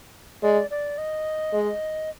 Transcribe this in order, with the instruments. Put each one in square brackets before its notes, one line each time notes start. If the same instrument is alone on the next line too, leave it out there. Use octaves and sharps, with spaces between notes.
[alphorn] G#3 [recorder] D5
[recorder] D5
D#5
[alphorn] G#3